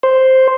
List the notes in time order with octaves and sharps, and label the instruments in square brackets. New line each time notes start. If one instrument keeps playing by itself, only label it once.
[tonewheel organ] C5